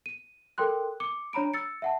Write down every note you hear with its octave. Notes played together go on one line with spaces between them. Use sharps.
D#7
A4 A#4 G5 C6 F#6
D6 C#7
D4 C#5 A#5 B5 D7
E6 A6 C#7
E5 F#5 A5